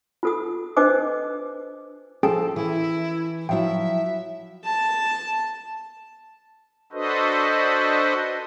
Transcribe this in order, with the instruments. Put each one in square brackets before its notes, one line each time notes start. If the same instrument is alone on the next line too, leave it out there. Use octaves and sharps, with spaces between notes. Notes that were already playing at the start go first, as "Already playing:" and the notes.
[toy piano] F4 A4 D#6
D4 B4 C5 D#5 D6 D#6
[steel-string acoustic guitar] F3 A4 [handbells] C#4 G#4 G5
[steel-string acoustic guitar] E3 [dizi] E4
[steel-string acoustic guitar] F3 F#3 E4 [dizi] E5 [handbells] G5
[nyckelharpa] A5
[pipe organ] D4 F#4 A4 B4 C5 D#5